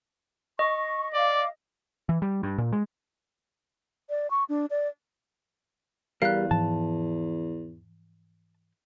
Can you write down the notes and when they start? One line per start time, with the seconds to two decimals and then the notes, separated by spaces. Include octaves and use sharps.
0.59 D#5 C#6
1.14 D5 F5 D6
2.09 E3
2.22 G3
2.43 G2
2.58 A#2
2.73 G#3
4.10 D5
4.31 C#6
4.49 D4
4.70 D5
6.22 E2 G3 A#4 F5 F#6
6.51 G#2 E3 F3 A5